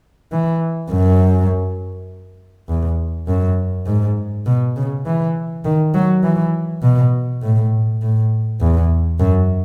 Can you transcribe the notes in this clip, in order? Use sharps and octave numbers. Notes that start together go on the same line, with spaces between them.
E3
F#2
E2
F#2
G#2
B2
C#3
E3
D#3
F#3
E3
B2
A2
A2
E2
F#2